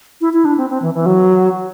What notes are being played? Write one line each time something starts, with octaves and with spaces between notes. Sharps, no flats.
E4
E4
D4
C4
C4
E3
E3
F#3